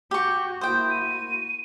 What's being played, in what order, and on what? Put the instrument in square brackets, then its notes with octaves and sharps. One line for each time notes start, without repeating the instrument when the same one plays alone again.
[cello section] F#4 [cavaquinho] G4 C#6 [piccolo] G6
[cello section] A#3 E4 F#4 [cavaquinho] C5 G5 [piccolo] D#6
[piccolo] D#7